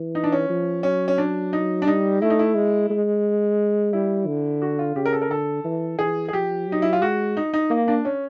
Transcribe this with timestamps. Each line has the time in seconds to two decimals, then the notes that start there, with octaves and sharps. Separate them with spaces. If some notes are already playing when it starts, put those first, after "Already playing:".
Already playing: E3
0.15 D#4
0.24 D4
0.32 C#4
0.49 F3
0.83 F#3 C#4
1.08 C#4
1.18 D4
1.53 D#4
1.82 D4
1.87 G3 D#4
2.21 A3 E4
2.30 D#4
2.39 E4
2.55 G#3
2.90 G#3
3.93 G3 E4
4.27 D3
4.62 F#4
4.79 F4
4.95 C#3 G4
5.06 A#4
5.13 A4
5.22 A#4
5.30 D3 A4
5.64 E3
5.99 E3 G#4
6.28 G#4
6.33 F3 G4
6.67 F#3
6.72 D#4
6.82 E4
6.93 F4
7.02 G#3 F#4
7.37 D#4
7.53 D#4
7.70 A#3
7.88 D4
8.05 C#4